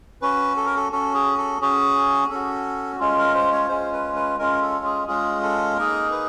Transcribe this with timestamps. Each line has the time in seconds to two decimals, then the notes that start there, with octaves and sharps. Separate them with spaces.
0.22 C#4 F#4 B4
0.57 A4
0.66 A#4
0.76 A4
0.92 C#4 F#4 A4
1.14 G#4
1.38 A4
1.61 C#4 F#4 G#4
2.30 C#4 F#4 A4
2.99 G#3 C#4 F4
3.18 A#4
3.34 C5
3.52 C#5
3.69 G#3 C#4 F4 C5
3.92 B4
4.16 B4
4.39 G#3 C#4 F4 A#4
4.62 A4
4.85 G#4
5.07 G#3 C#4 F4 G#4
5.42 A4
5.77 A#3 D#4 G#4 A#4
6.11 B4